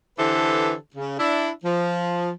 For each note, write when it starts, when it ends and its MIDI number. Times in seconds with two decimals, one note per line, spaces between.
0.18 0.73 50
0.18 0.73 52
0.18 0.73 67
0.18 0.73 69
0.18 0.73 71
0.18 0.73 72
0.95 1.17 49
1.19 1.50 62
1.19 1.50 64
1.65 2.30 53